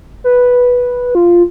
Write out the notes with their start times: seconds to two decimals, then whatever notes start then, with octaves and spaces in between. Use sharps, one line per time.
0.24 B4
1.15 F4